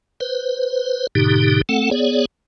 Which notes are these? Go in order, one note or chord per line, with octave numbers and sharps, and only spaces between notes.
B4 C5
G#2 B2 D3 D#4 G4
A3 C4 A4 F#5
B3 G#4 C#5 D5